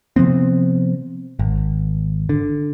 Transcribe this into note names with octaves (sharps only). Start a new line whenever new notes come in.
C3 F3 B3 C4
G#1
D3